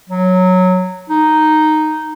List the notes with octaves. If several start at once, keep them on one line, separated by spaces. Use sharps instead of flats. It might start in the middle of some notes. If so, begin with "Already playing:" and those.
F#3
D#4